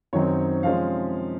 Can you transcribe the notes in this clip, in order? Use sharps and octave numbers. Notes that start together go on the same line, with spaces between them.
F#2 D#3 F#3 C4 D#4 C#5
C3 F3 G#3 C#4 F5